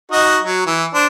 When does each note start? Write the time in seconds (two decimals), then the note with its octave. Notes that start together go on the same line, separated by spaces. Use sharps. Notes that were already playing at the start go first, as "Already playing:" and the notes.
0.12 D#4 F#4 D#5
0.43 F#3
0.67 E3
0.94 D4 C5